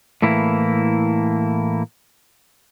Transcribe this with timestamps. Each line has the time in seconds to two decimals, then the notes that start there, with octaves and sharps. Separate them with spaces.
0.22 A2 E3 A#3 E4